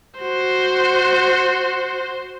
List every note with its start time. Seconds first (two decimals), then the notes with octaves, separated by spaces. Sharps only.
0.19 F#4 C5